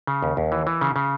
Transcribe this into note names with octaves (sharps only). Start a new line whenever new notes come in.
C#3
D#2
D#2
E3
E3
C#3
C#3